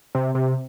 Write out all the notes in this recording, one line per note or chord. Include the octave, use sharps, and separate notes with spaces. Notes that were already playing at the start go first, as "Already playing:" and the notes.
C3
C3